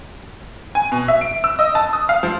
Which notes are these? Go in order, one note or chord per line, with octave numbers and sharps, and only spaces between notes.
G#5
B2
E5
D7
E6
D#5
A5
D#6
F5
F3